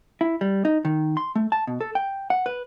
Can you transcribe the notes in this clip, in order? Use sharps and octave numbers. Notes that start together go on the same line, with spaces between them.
E4
G3
D#4
D#3
C6
A3
A5
B2
A4
G5
F#5
B4